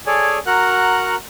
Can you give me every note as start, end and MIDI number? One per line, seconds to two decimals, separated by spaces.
0.07 0.38 68
0.07 0.38 69
0.07 0.38 73
0.07 0.38 74
0.07 0.38 80
0.46 1.15 66
0.46 1.15 70
0.46 1.15 78
0.46 1.15 82
0.46 1.15 90